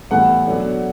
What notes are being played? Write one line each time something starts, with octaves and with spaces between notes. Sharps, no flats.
A2 E3 G3 B3 F#5
B2 F#3 A3 D4